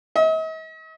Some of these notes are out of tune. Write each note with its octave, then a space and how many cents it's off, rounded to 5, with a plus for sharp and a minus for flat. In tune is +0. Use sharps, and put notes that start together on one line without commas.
D#5 +45